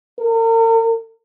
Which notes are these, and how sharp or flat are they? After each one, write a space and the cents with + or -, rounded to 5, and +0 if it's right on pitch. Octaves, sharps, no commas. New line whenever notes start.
A#4 -40